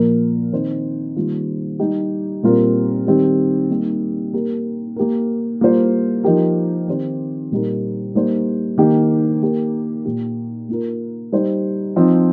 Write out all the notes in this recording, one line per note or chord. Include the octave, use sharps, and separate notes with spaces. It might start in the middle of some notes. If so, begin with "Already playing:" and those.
Already playing: A#2 F3 A#3 F4 A#4
D#3 C4 D#4 C5
D#3 G3 A#3 F4
G3 D#4 G4
A#2 G3 C4 F4 A#4
D#3 G3 C4 G4
G3 A#3 D#4 G4
A#3 G4 A#4
A#3 G4 A#4
G3 A#3 F4 C5
F3 D#4 G4 A#4
D#3 C4 G4 C5
A#2 G3 D#4 G4 A#4
G3 A#3 D#4 C5
D#3 A#3 G4
A#3 G4 A#4
A#2 A#3 G4
A#3 F4 A#4
G3 D#4 C5
F3 C4 D#4